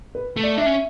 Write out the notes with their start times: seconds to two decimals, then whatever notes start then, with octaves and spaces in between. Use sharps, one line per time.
0.15 B4
0.37 A3
0.43 D5
0.58 D4 E5
0.66 C#4